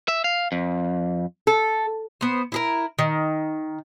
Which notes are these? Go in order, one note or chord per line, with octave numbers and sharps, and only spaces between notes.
E5
F5
F2
A4
B3 C5
E4 G#4 A#4
D#3